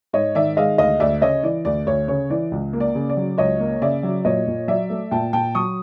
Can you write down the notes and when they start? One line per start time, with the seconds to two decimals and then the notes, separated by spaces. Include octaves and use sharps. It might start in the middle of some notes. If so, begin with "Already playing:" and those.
0.13 G#2 C#5 D#5
0.35 D#3 D5 E5
0.57 G#3 D#5 F5
0.78 D2 D#5 F5
1.00 D2 D5 E5
1.22 C#3 C#5 D#5
1.43 E3 D5
1.65 D2 D5
1.87 D2 C#5
2.08 C#3 C#5
2.30 E3 D5
2.52 C#2
2.73 A#3
2.80 D5
2.95 C#3
3.10 D5
3.17 F#3
3.38 C#2 C#5 D#5
3.60 A#3
3.82 C#3 D5 E5
4.03 F#3
4.25 A#2 C#5 D#5
4.47 A#2
4.68 F#3 D5 E5
4.90 A3
5.11 A#2 G5 A5
5.33 A#2 G5 A5
5.55 F#3 C#6 D#6